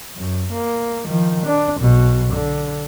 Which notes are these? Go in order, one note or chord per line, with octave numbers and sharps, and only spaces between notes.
F#2
A#3
D#3 F3
D4
B1 B2
D3